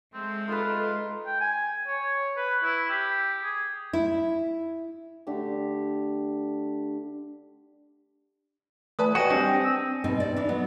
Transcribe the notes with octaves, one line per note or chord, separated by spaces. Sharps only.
G#3 A3 C4
D#4 F4 A4 B4
G5
G#5
C#5
B4
E4
G4
G#4
E4
D3 A3 D4 G4
E3 A3 B4 D5 A5 D#6
F#4 C#5 D#5 G5 G#5 A#6 D#7
G3 C4 D4 A#6
E6
G#2 B2 C4 D#4
D5
E3 D4 D#4
F#3 B3